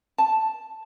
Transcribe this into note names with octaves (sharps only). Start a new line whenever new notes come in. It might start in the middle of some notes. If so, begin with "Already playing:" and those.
A5